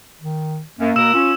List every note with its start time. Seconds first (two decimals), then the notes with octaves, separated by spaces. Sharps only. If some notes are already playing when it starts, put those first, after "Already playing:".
0.21 D#3
0.79 F#2 A#3
0.96 B2 A#4 E6 E7
1.14 C#4 F4